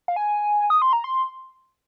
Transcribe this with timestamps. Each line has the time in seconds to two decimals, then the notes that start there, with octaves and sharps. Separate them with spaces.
0.08 F5
0.16 G#5
0.70 D#6
0.82 C6
0.93 A#5
1.04 C6